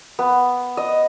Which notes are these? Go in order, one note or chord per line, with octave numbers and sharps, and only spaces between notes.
B3
D#5